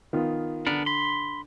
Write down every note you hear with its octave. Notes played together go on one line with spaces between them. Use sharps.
D#3 B3 F4
D3 B3 D4 A#4
B5 C6